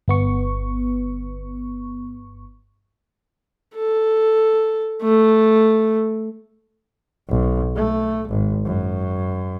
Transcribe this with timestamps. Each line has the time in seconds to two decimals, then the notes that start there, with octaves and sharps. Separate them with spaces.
0.08 G1 B3 C#6
3.75 A4
5.02 A3
7.29 B1
7.76 A3
8.29 G#1
8.64 F#2